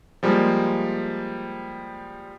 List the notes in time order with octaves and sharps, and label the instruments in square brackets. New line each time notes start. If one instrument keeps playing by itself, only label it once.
[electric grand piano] F3 G3 G#3 A#3